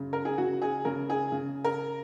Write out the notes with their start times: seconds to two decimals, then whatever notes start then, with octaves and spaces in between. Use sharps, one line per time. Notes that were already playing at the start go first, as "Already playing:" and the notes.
Already playing: F#2 C#3
0.13 A#4
0.25 G#4
0.38 C#3 F#4
0.62 G#4
0.85 C#3 A#4
1.10 G#4
1.32 C#3
1.64 A#4